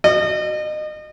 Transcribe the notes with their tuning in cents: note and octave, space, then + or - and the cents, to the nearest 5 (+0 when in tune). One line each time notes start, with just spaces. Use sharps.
D#5 -30